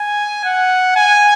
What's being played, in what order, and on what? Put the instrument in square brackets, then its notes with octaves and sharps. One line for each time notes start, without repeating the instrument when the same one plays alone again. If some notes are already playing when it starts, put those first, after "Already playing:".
Already playing: [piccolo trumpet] G#5
F#5
G#5